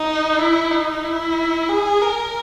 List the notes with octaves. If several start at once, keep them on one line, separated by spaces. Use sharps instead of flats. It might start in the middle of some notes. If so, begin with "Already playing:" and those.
Already playing: D#4
E4
D#4
E4
G#4
A#4